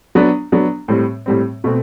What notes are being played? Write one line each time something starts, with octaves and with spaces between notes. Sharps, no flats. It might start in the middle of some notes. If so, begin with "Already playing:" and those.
F#3 B3 D4
F#3 B3 D4
A2 G3 C4
A2 G3 C4
B2 A3 C4